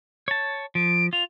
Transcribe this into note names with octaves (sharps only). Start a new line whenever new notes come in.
C#5 A5
F3 D7
F4 F7